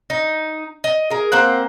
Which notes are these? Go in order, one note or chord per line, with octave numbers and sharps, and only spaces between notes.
D#4
D#5
G#4 A#4
A#3 C4 C5 F#5